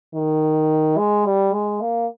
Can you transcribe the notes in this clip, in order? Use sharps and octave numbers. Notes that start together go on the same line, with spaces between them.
D#3
G#3
G3
G#3
A#3